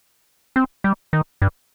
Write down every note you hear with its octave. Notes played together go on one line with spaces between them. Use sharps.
C4
G3
D#3
G2